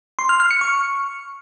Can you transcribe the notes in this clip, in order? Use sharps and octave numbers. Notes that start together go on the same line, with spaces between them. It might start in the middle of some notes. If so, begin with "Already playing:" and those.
C6
F6
F6
C#7
C#6